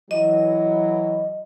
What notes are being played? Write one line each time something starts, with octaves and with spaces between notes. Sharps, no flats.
E3 F#3 D#5